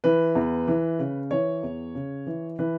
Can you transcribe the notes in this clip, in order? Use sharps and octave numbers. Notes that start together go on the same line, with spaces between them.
E3 B4
E2
E3
C#3
E3 C#5
E2
C#3
E3
E3 B4